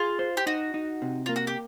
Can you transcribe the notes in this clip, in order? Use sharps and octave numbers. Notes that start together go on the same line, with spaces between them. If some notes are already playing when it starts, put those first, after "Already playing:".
Already playing: F4 G#4
C5
G4
D#4 F#4
D#4
C3
A#3 F4
F#4
G4